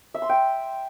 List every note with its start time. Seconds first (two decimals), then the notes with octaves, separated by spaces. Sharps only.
0.14 E5
0.22 C6
0.29 G5